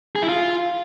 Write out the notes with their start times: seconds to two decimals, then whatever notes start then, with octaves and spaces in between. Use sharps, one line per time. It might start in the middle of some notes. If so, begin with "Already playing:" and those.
0.16 G#4
0.22 E4
0.29 F4